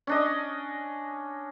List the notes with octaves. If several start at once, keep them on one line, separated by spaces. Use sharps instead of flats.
C#4 D4 D#5